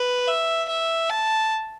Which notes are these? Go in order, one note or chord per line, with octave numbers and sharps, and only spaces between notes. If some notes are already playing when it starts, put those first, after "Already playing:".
Already playing: B4
E5
E5
A5